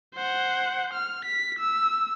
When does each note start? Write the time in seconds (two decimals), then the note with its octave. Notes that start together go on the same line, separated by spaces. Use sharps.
0.15 C5 F#5
0.94 F6
1.26 B6
1.59 E6